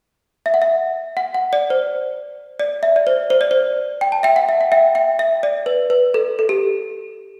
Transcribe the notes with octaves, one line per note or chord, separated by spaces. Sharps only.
E5
F#5
E5
F#5
F#5
D5
C5
D5
E5
D5
C5
C5
D5
C5
G5
A5
E5 G5
F#5
E5
F#5
E5 G5
E5 G5
E5
D5
B4
B4
A4
A4
G4